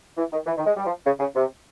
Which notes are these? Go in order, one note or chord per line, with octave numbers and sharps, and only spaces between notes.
E3
D#3
E3
D#3
G#3
G3
F3
C#3
C#3
C3